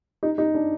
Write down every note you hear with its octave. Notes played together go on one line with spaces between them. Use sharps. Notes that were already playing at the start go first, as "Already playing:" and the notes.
D#4
D#4
D4